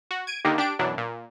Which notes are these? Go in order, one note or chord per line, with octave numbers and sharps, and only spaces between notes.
F#4
G#6 D7 D#7
D3 D#3 A#3 D#4 G4
D4 G4 D7
F#2 B2 E3 F#3 D4
A#2